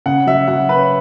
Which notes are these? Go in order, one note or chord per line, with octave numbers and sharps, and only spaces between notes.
C#3 F#5
F#3 E5
F#3 F#5
C#4 B4